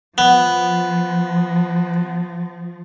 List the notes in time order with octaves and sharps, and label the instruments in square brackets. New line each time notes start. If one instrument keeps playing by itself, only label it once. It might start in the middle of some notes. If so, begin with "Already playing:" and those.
[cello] F3 [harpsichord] B3